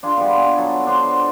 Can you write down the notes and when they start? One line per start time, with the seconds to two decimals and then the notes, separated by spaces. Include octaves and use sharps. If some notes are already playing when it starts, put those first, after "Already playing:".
0.03 D4 F4 G#4
0.17 G3 B3
0.37 G#5
0.57 F#3 A4
0.86 D4 C5 F#5